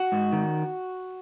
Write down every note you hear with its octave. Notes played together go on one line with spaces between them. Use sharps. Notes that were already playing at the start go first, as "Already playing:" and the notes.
Already playing: F#4
G#2
D#3